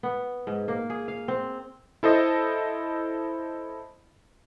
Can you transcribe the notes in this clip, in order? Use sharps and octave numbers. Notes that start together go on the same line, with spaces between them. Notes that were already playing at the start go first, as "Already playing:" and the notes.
B3
G#2
A#3
G#4
F5
C4
E4 A4 C5 D#5